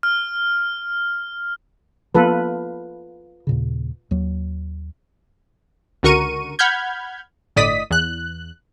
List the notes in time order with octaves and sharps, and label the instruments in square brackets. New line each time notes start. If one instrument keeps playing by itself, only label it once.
[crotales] F6
[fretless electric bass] F3 A#3 B3 [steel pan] F4 A4 B4
[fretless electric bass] D#2 A#2 C#3
D#2 F#3
[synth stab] C#2 D3 F#4 A#4 C#6 D#7
F#5 B5 F6 G6 G#6
G1 A2 D5 D#5 D#6 B6
E2 F#6